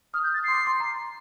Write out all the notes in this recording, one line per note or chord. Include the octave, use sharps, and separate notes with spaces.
D#6 F6
G6
A6
C6 C7
D6
C6
A#5